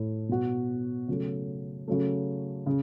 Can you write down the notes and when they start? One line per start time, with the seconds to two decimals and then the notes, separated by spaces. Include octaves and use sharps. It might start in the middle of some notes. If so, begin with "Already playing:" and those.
Already playing: A2 A3 E4
0.29 B2 B3 F#4
1.08 C#3 F#3 A3
1.88 C#3 F#3 A3
2.66 C#3